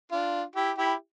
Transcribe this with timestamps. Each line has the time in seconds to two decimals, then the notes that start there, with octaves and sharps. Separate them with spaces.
0.12 D4 F4
0.56 E4 G4
0.78 E4 G4